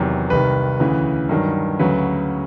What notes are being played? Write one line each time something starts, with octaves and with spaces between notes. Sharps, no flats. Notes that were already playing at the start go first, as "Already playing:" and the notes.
Already playing: E2 C3 D#3 F#3
C2 C3 D#3 B4
D2 C#3 E3
G2 D#3 F#3
D2 C#3 F#3 B4